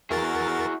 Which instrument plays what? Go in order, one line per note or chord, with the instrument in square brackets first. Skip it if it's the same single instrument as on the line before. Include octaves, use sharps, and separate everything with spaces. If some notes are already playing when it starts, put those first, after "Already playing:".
[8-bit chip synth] E2 A#4 A6 [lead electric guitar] E4 G#4 [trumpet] F#4